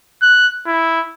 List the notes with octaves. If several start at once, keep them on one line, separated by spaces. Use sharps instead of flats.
F#6
E4